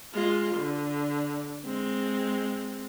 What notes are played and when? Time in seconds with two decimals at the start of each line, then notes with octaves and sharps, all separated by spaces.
0.14 G#3 F4
0.56 D3
1.65 G#3 C4